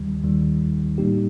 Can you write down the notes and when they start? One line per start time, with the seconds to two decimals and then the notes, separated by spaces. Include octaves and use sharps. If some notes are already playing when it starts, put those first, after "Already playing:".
Already playing: D#2 D#3 G3
0.24 D#2 D#3 G3
0.98 A2 G3 A#3 D#4 G4